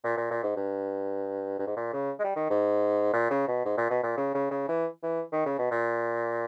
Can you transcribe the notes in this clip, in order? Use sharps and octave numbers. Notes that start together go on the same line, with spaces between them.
A#2
A#2
A#2
G#2
G2
G2
G#2
A#2
C#3
G#3
G3
D#3
G#2
A#2
C#3
B2
G#2
A#2
B2
A#2
C#3
C#3
C#3
E3
E3
D#3
C#3
B2
A#2